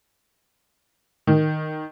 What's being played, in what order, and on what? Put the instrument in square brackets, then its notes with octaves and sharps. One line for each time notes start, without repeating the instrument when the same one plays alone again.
[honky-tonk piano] D#3